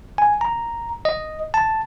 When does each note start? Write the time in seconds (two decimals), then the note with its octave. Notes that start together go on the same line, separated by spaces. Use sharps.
0.18 G#5
0.41 A#5
1.05 D#5
1.54 A5